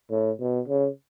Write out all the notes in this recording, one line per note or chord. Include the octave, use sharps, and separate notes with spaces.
A2
B2
C#3